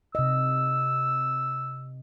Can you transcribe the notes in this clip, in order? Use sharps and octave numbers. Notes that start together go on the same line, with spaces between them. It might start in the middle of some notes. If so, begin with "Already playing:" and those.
C3 D#5 E6